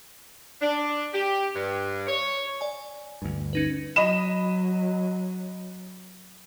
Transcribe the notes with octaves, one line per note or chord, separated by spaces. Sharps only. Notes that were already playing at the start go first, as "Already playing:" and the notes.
D4
G4
G2
C#5
D5 G#5
D2 G2
C#4 D#4 B4
F#3 D#5 B5 E7